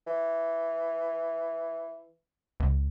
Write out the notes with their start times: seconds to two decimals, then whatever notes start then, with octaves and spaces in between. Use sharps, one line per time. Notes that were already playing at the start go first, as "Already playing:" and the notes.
0.07 E3
2.60 C#2